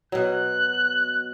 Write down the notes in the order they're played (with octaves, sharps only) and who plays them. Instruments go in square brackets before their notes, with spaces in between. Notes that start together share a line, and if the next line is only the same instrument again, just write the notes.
[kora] B2 F#3 [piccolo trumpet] F#6